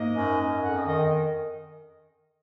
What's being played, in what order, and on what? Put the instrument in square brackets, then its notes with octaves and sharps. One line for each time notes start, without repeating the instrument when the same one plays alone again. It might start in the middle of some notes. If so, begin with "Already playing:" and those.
Already playing: [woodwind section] G#2 A#3 D#5
F#2
F#2
F2 F#5
D#5
D#3 D#5